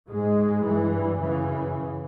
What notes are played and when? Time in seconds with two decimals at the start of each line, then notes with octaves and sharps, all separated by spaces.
0.09 G#2 G#3
0.65 G2 E3
1.20 F#2 C#3 E3